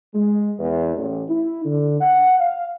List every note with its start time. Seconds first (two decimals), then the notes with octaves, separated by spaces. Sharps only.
0.14 G#3
0.59 E2
0.96 A1
1.29 E4
1.65 D3
2.01 F#5
2.39 F5